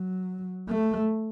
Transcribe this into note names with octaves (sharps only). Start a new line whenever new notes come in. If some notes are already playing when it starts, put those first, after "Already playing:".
Already playing: F#3
A3